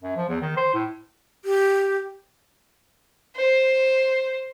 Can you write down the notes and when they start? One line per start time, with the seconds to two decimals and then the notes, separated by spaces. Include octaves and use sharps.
0.03 F#2
0.16 F3
0.29 E2
0.42 D#3
0.57 C5
0.74 A2
1.45 G4
3.36 C5